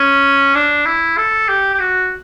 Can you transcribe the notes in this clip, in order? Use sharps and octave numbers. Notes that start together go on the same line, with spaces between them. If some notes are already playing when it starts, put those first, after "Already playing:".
Already playing: C#4
D4
E4
A4
G4
G4
F#4